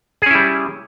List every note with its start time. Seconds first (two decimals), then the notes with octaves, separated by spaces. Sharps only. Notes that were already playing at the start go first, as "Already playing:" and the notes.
0.22 G#4
0.26 C#4
0.31 E4
0.35 G3